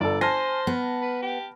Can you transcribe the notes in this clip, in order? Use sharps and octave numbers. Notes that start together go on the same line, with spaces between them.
G1 A4 D5
C5 G#5 A5 F6 A#6
B3
B4
G4